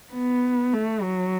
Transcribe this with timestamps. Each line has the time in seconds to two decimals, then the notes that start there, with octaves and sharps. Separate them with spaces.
0.13 B3
0.73 A3
1.02 F#3